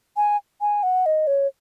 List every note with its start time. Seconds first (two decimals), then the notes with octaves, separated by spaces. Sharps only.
0.17 G#5
0.61 G#5
0.83 F#5
1.06 D#5
1.27 C#5